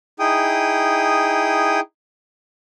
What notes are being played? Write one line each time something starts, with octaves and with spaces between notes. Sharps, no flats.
D#4 E4 G#4 G5 D#6